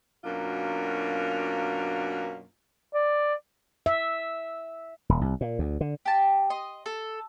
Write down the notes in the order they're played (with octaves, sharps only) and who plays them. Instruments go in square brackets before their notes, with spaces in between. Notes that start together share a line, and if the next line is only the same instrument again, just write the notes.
[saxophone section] F#2 B2 A#3 D4 F4
[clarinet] D5
[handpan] E5
[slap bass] D#1
C2
A#2
D2
D3
[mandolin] G4 A5
D#5 C6
A4